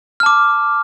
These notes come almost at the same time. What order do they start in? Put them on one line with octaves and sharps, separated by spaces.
F6 A5 D6